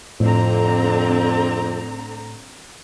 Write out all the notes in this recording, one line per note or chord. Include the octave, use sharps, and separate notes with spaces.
F2 A2 D3 C4 A#5